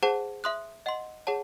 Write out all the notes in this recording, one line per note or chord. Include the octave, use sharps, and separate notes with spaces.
G#4 C5 F#5 A5
E5 C6 D#6 F#6
D#5 F#5 C6
G#4 C#5 F#5 A5